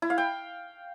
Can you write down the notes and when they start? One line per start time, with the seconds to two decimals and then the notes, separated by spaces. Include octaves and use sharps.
0.02 E4
0.10 F5
0.18 G5